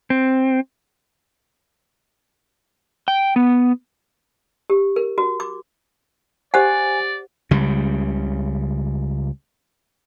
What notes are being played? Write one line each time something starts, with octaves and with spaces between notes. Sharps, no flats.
C4
G5
B3
G4
A#4
F#4
D6
G4 C5 D5 F#5 G#5
C#2 C#3 G3